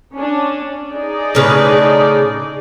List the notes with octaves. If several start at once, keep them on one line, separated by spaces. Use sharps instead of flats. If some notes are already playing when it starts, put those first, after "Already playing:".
C#4 D4
D#4 G#4 D5
A2 C#3 B4